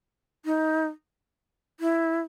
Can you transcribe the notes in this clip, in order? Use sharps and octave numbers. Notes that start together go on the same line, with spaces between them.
D#4
E4